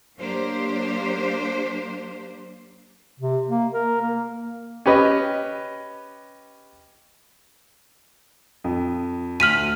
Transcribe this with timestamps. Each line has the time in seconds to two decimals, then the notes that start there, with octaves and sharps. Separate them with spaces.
0.18 F#3 A#3 D4 G4 C5
3.20 C3
3.48 A#3
3.74 A#4
4.02 A#3
4.86 C#4 G4 B4 D#5
8.64 F2
9.40 D2 F6 B6 D#7 F7 F#7